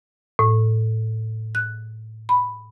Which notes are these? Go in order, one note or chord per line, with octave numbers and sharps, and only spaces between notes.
A2
F#6
B5